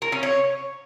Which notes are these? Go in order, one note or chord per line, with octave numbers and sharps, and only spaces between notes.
A#4
C#4
C#5